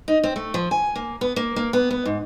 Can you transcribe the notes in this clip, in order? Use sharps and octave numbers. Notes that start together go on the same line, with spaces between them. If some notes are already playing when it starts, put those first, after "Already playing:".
D#4
C4
A3
F3
G#5
A#3
B3
A#3
A#3
B3
B3
G#2